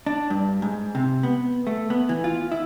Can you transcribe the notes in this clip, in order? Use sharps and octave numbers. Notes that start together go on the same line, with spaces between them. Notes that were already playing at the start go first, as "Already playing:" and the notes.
D4
G2
G#2
C3
B3
A3
B3
E3
F4
E4